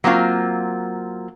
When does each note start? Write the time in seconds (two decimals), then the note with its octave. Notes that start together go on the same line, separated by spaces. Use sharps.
0.04 F#3 A#3 C4 F4